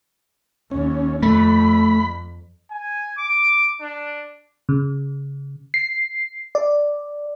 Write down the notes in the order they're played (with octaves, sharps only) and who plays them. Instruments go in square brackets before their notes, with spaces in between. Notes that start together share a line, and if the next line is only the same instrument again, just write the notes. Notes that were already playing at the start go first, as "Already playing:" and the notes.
[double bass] D#2 [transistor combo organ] C#4
[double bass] F2 [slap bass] A3 [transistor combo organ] B5
[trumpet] G#5
D6
D4
[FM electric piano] C#3
C7
D5